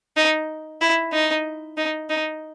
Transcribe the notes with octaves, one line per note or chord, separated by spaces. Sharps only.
D#4
E4
D#4
D#4
D#4